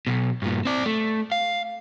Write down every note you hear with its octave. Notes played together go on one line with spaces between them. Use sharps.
B1 B2
G2 A#2
C4 D5
A3
F5